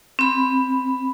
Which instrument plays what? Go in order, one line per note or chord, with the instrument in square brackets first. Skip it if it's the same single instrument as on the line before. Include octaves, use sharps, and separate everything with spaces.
[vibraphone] C4 B5